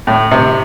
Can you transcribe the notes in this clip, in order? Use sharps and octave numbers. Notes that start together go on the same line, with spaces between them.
A2
C3